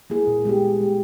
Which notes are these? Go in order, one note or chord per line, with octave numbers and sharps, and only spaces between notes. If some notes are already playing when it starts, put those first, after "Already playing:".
A#3 E4 G#4
A#2
G#3 B3 G4
A#2
G#3 B3 G4